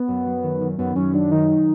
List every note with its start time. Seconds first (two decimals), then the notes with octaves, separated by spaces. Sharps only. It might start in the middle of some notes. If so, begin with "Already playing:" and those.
Already playing: B3
0.08 F#2
0.26 F#3
0.43 D#3
0.61 D#3
0.78 F#2 B3
0.96 F#2 C#4
1.13 F#3 D4
1.31 D#3 D#4